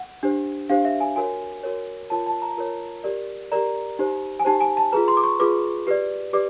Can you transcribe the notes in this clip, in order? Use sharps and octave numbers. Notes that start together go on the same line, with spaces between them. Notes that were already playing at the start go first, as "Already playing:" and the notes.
Already playing: F#5
D4 G4 C5
D4 G4 C5 F5
E5
G#5
F#4 A#4 C#5 G#5
F#4 A#4 C#5
F4 A#4 C#5 A5
A5
A#5
F4 A#4 C#5
G4 A#4 D5
G4 A#4 D5 A#5
D#4 G4 C5
G#5
D#4 G4 C5 A5
G#5
A5
F4 G#4 B4 A#5
C6
D6
C#6
F4 G#4 B4 D6
G4 B4 D5
G4 B4 D5 D6